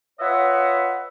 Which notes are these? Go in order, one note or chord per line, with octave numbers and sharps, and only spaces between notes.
F4 B4 C#5 D#5 E5 F#5